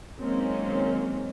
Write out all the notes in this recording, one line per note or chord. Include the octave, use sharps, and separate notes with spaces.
D#3 F#3 G#3 A#3 C4 C#4